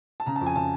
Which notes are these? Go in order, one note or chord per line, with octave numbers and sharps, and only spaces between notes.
A5
C#3 A#5
A5
F2
G#5
C#3 A5